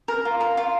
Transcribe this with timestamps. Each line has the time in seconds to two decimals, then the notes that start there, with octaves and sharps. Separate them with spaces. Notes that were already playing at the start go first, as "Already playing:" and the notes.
0.08 A#4
0.25 F4
0.40 A#4
0.57 F4